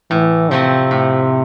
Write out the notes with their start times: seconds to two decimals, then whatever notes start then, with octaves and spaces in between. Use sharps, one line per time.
0.10 A2 E3
0.51 C3 F3 A3 C4
0.91 A2